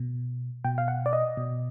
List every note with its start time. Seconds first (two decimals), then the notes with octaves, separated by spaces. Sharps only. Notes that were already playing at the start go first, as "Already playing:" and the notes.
Already playing: B2
0.65 B2 G5
0.78 F5
0.88 F#5
1.06 D5
1.13 D#5
1.37 B2